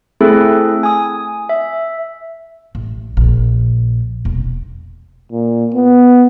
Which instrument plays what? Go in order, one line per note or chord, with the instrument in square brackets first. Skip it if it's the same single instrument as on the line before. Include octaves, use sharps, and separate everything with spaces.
[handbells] A3 C4 E4 G#4 A4
G#5 D#6
E5
[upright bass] A1
A#1
E1
[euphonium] A#2
B3